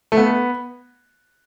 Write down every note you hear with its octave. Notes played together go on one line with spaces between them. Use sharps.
A3
B3